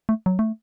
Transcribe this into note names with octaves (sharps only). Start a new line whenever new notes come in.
A3
F#3
A3